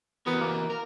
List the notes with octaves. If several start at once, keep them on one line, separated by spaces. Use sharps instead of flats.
E3 B3 F#4 A#4
A#3
A#4